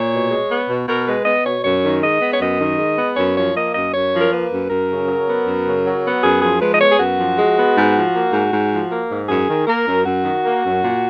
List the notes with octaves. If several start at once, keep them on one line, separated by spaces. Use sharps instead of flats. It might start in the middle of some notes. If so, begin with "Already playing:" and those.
Already playing: A#2 C#5
B2
G#3
B3
B2
B2 A#4
G#3 B4
B3 D#5
B2 C#5
F#2 C#5
D#3
G#3 D#5
B3
C#5
F#2 D#5
D#3
G#3
B3
F#2 C#5
F3 C#5
A#3 D#5
F#2 D#5
F#2 C#5
F3
A#4
A#3 B4
F#2
F#2 A#4
C#3
F#3
B3
F#2
C#3
F#3
B3
F#2 G#4
F3 G#4
G#3 B4
D#5
B3 C#5
G#4
F#2 F#4
F3
G#3
B3
G#2
F3
A#3
G#2
G#2
F3
A#3
G#2
F#2 G#4
D#3
A#3 A#4
F#2
F#2 F#4
D#3
A#3
F#2
A#2